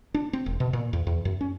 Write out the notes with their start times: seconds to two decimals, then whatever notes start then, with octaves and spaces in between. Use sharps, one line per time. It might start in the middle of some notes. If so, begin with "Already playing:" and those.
0.14 D4
0.33 C4
0.46 E1
0.60 B2
0.73 A#2
0.93 E2
1.07 E2
1.25 F#2
1.41 C#4